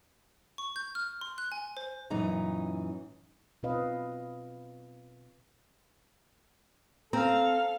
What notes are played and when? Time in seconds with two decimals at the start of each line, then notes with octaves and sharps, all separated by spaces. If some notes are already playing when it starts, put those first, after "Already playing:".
0.58 C#6
0.76 G6
0.95 F6
1.21 C6
1.38 F#6
1.52 G#5
1.77 C5
2.10 F#2 A#2 E3 D#4 A#5
3.63 B2 C4 F4 B4 D#5 F5
7.13 C4 A4 F5 A#5